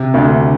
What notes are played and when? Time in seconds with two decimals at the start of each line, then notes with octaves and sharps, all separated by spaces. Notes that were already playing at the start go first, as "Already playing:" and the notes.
Already playing: C3
0.14 D2